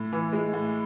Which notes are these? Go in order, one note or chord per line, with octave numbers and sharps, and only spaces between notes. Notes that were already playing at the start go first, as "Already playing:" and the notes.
Already playing: A2
E3
G#3
A2